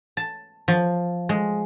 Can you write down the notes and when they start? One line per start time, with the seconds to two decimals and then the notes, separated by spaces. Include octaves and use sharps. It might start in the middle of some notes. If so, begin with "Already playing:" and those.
0.17 A5
0.68 F3
1.29 G#3